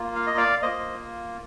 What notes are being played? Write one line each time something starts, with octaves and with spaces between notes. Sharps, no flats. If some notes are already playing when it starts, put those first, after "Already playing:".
Already playing: A#3 F4
F5
D#5
D5 F5
A#3 F4 C5 D#5